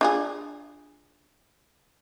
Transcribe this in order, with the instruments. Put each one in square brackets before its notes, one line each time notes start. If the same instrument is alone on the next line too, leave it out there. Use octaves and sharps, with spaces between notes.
[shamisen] D4 F4 G#4